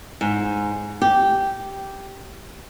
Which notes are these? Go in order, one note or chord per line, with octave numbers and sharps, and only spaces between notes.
G#2
G4